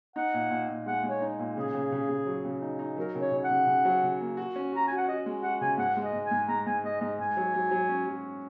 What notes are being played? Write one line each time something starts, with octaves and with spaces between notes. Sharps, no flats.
D#4 F#5
A#2
A#2
A#2
G#3 F#5
G#3
C#5
D#4
A#2
C#3 G#4
C#3
C#3
C#3
F#3
C#3
D#4
D#4
F#3 A#4
C#3
C#5
C#3
F#5
C#3
C#3
F#3
C#3
A#3
F#4
C#4
F#4 A#5
F#4 G#5
F#5
F#4 D#5
G#3
F#4 F#5
C#3 G#5
G#2 F#5
G#3
D#5
G#2
G#5
G#2
G#2 A#5
G#2 G#5
G#3 D#5
G#2 D#5
G#2 G#5
F#3
F#3
F#3
C#4
F#3